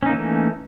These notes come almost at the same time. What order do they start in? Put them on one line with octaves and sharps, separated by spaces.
C#4 D#4 A#3 E3 A3